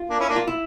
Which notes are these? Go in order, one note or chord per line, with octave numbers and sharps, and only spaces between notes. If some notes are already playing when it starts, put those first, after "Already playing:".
Already playing: F4
A#3 D4
C#4 E4
A#3 D4
F4
E4